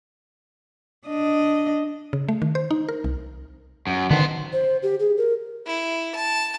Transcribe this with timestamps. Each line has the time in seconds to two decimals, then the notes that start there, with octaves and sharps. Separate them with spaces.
1.08 D4 D#5
2.13 C#3
2.29 A3
2.42 D#3
2.55 C5
2.71 D#4
2.89 A#4
3.04 C2
3.87 F#2
4.11 D3 D#3 B3 C5
4.53 C5
4.83 G4
5.00 G#4
5.18 A#4
5.66 E4
6.15 A5